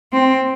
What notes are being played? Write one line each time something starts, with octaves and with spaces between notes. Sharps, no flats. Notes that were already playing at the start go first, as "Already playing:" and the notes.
C4